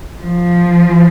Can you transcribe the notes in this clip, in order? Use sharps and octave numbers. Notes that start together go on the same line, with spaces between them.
F3